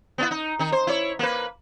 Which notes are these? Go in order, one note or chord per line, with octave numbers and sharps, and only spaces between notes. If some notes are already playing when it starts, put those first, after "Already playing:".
B3 C#4 E4
D#4
D#3 D#4
C5
E4 C#5
A#3 B4